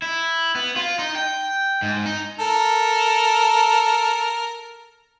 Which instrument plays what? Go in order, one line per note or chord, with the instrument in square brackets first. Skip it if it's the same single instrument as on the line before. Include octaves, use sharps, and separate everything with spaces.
[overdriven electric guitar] E4
B3
F4
D#4
G5
G#2
D#4
[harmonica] A4 A#4